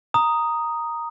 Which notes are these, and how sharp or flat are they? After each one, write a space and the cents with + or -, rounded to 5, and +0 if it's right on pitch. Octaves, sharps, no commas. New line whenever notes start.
A#5 +0 D#6 +0